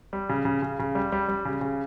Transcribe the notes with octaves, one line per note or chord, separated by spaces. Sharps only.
G3
C#3
C#3
C#3
C#3
G3
G3
G3
C#3
C#3